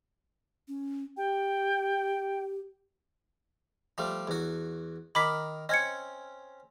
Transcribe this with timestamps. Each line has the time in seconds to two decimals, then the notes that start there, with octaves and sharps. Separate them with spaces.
0.68 C#4
1.17 G4 G5
3.98 F3 G3 A3
4.28 E2 F#4
5.15 D#3 A#4 B5 D6 B6
5.69 C4 C#4 D#5 G#6 C#7